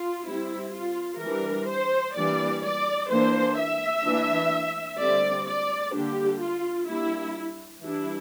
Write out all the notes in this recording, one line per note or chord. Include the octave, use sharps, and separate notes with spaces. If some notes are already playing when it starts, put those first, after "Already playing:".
Already playing: F4
G3 C4 E4
F4
E3 G3 D4 A#4
C5
E3 G3 A#3 D4 D5
D5
E3 A#3 D4 C5
E5
E3 A#3 D4
D3 G3 C4 D5
D5
D3 G3 A#3 D4 G4
F4
G3 A#3 D4 E4
E3 G3 D4 E4